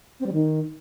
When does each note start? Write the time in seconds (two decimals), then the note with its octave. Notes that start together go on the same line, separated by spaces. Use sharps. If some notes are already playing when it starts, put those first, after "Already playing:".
0.20 C4
0.26 G3
0.32 D#3